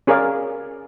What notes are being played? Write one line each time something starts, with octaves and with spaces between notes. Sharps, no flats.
C#4 G#4 A#4 D5 F5